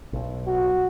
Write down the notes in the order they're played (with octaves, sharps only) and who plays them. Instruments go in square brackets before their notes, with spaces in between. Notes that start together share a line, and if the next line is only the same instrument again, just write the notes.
[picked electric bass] B1
[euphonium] F#4